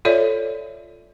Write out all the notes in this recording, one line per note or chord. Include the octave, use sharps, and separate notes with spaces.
F4 A4 C#5 D5 E5